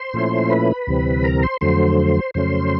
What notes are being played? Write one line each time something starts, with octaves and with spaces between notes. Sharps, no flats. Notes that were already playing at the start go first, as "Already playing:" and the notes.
Already playing: C5 C6
A#2 F3 A3 C#4 E4
B4 B5
D2 C3 E3 G3 C4
A#4 A#5
C5 C6
F2 D3 F#3 A3 C5 C6
F2 C#3 F#3 A3 C#4 C5 C6